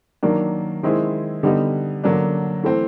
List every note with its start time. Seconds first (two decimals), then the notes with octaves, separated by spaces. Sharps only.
0.23 D#3 F#3 A#3 D4
0.83 D#3 G#3 C4 E4 G#4
1.43 D3 G3 B3 D#4
2.04 D3 F#3 A#3 D4
2.63 E3 A3 C4